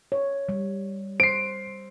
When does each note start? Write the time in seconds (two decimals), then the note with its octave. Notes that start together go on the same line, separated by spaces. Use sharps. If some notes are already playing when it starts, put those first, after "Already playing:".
0.12 C#5
0.49 G3
1.20 C5 C7 D7